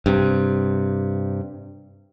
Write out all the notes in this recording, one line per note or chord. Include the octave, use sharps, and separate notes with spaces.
G2 C3